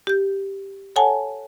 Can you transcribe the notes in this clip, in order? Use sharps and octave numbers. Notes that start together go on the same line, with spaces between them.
G4 G6
A4 C#5 F#5 G#5 A5